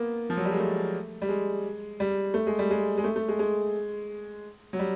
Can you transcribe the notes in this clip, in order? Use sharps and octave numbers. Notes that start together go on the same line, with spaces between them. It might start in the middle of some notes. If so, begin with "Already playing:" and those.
Already playing: A#3 B3
F3
F#3
G3
G#3
A3
G3
G#3
G3
A3
G#3
G3
G#3
G#3
A3
A3
G#3
G#3
F#3
G3